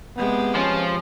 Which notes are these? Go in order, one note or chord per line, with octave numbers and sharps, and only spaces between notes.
C3 G#3 B3 G4
F3 C#4